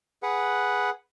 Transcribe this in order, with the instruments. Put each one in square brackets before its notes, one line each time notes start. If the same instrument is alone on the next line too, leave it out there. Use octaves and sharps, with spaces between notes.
[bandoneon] G#4 B4 F#5